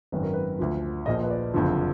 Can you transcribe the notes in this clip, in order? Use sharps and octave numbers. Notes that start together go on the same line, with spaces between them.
G#1 F#2 D#3 B4
A#4
B4
D2 D3 F3
A#1 A#2 F3 D#5
B4
D5
F#1 F2 D3 F3